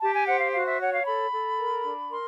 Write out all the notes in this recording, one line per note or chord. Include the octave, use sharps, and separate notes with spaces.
G4 A5
G#5
C5 F#5
F5
F#4 F5
E5
C#5 F#5
F5
A4 B5
A4
A#4
D4
A#4 C6